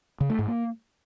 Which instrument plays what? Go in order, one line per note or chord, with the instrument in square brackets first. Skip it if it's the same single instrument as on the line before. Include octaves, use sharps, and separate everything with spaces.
[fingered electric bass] C#3
A3
G#2
A#3